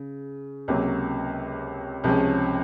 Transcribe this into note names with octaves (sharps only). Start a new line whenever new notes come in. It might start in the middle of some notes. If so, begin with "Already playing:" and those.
Already playing: C#3
C#2 C3 F#3 A#3 C#4
C#2 C3 F3 G#3 C#4